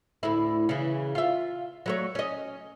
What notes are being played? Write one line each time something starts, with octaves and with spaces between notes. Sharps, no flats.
D2 A2 E4
C#3 E3
F4 E5
F#3 A3 C#5
C#4 D#5